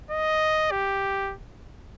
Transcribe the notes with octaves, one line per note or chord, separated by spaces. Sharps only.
D#5
G4